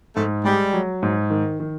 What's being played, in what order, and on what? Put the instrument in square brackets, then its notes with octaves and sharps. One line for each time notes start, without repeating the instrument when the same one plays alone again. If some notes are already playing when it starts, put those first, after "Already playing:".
[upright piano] G#2 [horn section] A3
[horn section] G3 [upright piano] G#3
[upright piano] F#3
G#2
D#3
D#3